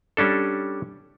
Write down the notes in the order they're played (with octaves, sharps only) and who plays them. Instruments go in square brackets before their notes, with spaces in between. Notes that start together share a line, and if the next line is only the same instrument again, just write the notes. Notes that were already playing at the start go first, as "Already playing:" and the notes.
[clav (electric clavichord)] G3 C#4 D4 A4